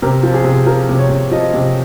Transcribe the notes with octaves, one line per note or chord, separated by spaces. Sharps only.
C3 A#4
F3
G#4
C3
F3 A#4
C3
C#5
C3
F3 D#5
C3